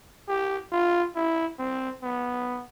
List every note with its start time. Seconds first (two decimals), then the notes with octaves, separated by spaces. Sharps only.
0.28 G4
0.72 F4
1.16 E4
1.59 C4
2.03 B3